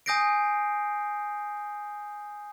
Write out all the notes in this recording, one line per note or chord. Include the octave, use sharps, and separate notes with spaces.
G#5 D#6 G6 A#6 C7 D7